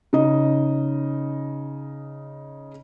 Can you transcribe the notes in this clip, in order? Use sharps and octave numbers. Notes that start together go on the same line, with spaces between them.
C#3 D#4 D#5